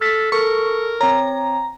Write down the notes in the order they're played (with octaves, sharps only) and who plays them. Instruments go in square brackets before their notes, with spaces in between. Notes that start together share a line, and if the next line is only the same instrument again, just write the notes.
[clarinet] A4 [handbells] F6 A6 B6
[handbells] A4 [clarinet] A#4 [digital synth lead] C#6
[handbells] C4 C#5 [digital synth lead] A#5